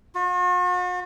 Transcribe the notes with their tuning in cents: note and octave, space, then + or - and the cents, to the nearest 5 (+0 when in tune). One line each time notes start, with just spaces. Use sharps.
F#4 -45